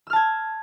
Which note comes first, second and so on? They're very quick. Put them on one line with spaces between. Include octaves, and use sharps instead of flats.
E6 F6 A5 G#6